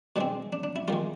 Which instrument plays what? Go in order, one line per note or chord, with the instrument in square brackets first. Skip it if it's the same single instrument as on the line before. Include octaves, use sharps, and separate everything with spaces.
[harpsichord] B2 G#3 C4 D4
D4
D4
E4
G2 D#3 G#3 F4